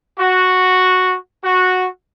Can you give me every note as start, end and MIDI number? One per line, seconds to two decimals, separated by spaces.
0.20 1.16 66
1.44 1.87 66